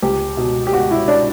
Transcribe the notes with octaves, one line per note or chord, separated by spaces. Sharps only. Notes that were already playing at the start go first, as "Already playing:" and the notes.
C#2 G4
B2
G4
B2 F#4
E4
D4